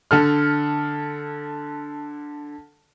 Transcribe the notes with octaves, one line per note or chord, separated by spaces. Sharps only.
D3 A4 F6